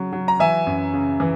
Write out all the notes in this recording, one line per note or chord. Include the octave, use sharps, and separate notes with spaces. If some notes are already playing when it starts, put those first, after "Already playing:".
Already playing: C#3 F#3
F#3
A#5
E3 E5 G#5
F#2
C#3
E3